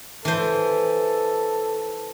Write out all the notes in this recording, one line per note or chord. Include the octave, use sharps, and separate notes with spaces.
E3 A4 C5